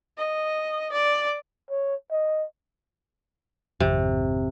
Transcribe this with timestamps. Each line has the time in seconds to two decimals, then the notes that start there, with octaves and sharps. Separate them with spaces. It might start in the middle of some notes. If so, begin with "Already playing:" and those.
0.18 D#5
0.92 D5
1.70 C#5
2.11 D#5
3.80 G#1 F2 C3